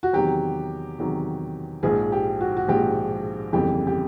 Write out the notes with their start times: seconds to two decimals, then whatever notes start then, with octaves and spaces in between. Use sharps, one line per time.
0.03 F#4
0.13 E2 C3 D#3 F#3 G4
0.99 E2 C3 D#3 F#3
1.83 A#1 G#2 F3 G#4
2.12 G4
2.41 F#4
2.57 F#4
2.68 A#1 G#2 F3 G4
3.53 G1 F2 C#3 E3 G4
3.87 G4